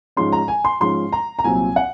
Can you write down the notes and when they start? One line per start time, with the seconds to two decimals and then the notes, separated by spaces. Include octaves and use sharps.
0.17 G#2 F3 G#3 C#4 C6
0.32 A#5
0.48 G#5
0.65 C6
0.80 G#2 F3 G#3 C#4 C6
1.13 A#5
1.39 A#5
1.44 C2 A#2 F#3 C4 G#5
1.76 F#5